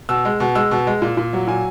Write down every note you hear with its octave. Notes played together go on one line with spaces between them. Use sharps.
B2 E6
G#3
B2
G#3 E6
B2
G#3
A#2
A#2
F#3
A#2 G#5